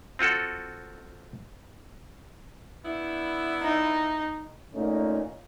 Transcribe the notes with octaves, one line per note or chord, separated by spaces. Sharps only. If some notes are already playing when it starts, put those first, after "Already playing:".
C4 F4 F#4 A4
B3 D4 E4
D#4
A#2 A3 C#4 D#4